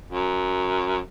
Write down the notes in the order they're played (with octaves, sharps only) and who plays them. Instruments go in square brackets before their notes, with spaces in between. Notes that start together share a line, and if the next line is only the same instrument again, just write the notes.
[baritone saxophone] F#2